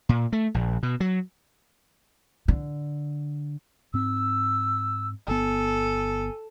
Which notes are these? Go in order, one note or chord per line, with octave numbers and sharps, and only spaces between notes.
A#2
A3
A#1
B2
F#3
D3
G#2 C4 E6
G1 B3 A4 G#5